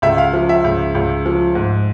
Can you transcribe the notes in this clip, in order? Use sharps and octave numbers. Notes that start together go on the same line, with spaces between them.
C#2 E5
F5
F3
E5
C#2
C#2
F3
G#2